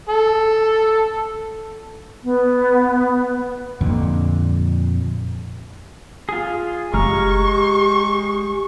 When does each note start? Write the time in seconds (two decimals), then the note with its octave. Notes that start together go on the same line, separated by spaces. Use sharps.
0.09 A4
2.24 B3
3.81 F2 A#2 D3
6.29 F4 G#4
6.94 F#1 G#3 G4 A#5 C#6 F6